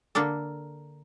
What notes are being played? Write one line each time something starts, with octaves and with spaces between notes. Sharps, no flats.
D3 A#3 D4 A4